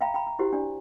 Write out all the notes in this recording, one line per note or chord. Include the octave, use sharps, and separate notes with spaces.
E5 F5 G5 A#5 B5
G5 A#5 B5
A#5
E4 F#4 G4 C5
D4 D5